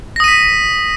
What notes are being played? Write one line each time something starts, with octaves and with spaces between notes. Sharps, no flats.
D#6 A#6 B6 D#7